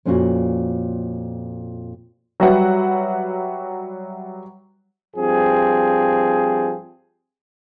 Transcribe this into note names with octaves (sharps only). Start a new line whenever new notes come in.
F2 A#2 C#4 F4 F#4
F#3 G3 F#4 B4 E5 F#5
G2 F3 C4 G#4